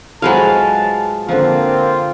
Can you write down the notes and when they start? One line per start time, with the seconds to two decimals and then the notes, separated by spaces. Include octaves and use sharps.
0.22 A2 F3 F#3 G#3 B4 F5 A5
1.29 D3 F3 A#3 C4 F4